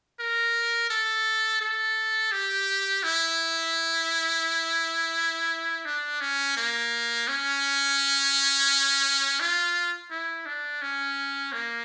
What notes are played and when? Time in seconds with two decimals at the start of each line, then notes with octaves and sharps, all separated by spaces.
0.20 A#4
0.90 A4
1.61 A4
2.32 G4
3.03 E4
5.85 D4
6.21 C#4
6.57 A#3
7.28 C#4
9.40 F4
10.11 E4
10.46 D4
10.82 C#4
11.53 A#3